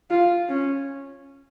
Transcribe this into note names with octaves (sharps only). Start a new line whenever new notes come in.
F4
C#4